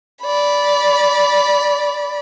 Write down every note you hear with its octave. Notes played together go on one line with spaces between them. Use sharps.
D5 B5